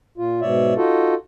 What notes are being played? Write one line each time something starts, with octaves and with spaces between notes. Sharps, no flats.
A#2 F4
G#2 B2 C#5 D5 E5
D#4 F4 F#4 A4